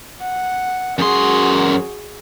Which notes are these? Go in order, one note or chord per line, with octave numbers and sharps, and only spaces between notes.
F#5
F#2 F#4 G#4 C6